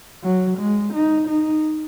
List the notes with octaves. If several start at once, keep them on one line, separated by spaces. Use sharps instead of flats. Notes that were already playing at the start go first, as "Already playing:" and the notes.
F#3
G#3
D#4
D#4